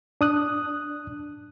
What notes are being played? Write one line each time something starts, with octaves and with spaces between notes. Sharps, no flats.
D4 D#6 F#6